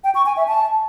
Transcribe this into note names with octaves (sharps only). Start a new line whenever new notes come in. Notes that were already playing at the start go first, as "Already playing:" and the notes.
G5
C#6
G#5
E5
A5